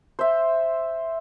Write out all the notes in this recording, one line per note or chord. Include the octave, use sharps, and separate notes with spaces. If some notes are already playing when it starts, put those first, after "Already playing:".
C5 E5